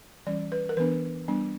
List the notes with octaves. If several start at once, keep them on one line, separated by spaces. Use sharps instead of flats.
E3 G3 C#4 D5
B4
A#4
E3 B3 D4 B4
G3 B3 D4